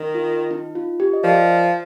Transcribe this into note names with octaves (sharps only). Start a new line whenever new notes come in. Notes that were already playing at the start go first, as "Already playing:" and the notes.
Already playing: D#3
F4
D#4
F4
G4
D#5
F3 A#4 D5